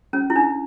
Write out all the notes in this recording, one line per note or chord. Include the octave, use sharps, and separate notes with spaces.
C#4
E4
D4